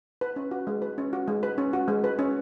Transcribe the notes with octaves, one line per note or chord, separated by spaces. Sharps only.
B4
C#4
F#4
G#3
B4
C#4
F#4
G#3
B4
C#4
F#4
G#3
B4
C#4